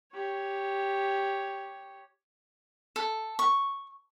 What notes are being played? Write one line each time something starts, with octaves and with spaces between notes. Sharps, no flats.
G4 C#5
A4
C#6